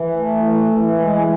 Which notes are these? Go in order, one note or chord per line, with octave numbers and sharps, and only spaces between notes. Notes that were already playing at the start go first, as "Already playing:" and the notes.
Already playing: E3
A3
E3
E3
G#3